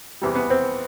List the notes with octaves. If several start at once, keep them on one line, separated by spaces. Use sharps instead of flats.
E2 C3 E3 G3
B3
C4